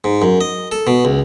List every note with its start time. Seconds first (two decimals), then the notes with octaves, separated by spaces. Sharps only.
0.04 G#2
0.22 F#2
0.41 D#5
0.72 A4
0.87 B2
1.05 C#2